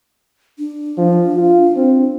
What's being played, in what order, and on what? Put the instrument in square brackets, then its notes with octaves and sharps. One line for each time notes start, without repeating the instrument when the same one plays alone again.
[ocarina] D4
[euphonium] F3
F4
C4